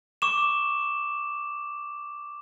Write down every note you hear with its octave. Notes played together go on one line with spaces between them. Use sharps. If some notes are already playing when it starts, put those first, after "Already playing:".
C#6 D6 E7